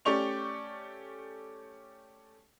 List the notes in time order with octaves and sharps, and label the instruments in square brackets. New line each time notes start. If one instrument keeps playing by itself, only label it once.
[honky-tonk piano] A3 C#4 G4 D5 C#6 F7